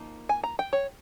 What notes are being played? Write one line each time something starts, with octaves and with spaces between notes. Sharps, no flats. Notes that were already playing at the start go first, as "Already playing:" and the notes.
Already playing: F3 A#3 D#4
G#5
A#5
G5
C#5